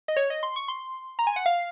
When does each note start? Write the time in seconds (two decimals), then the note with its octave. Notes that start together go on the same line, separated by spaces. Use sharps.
0.08 D#5
0.16 C#5
0.30 D#5
0.43 C6
0.56 C#6
0.68 C6
1.19 A#5
1.27 G#5
1.36 F#5
1.46 F5